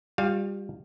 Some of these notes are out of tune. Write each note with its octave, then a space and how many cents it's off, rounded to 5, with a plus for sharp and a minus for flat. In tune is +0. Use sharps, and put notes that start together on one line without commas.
G3 +20 F4 +45 F5 +0